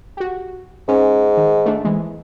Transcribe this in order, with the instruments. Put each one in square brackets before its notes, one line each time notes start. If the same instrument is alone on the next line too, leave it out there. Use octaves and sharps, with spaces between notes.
[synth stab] F#4 G4
[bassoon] G#2 [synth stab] C#4
[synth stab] D#3
A3 D4
E3 G#3